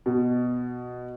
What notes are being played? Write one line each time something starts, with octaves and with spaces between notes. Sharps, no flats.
B2